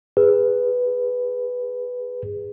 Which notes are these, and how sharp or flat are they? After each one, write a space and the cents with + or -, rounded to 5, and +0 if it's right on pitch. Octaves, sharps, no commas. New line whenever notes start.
G#4 -20 B4 +0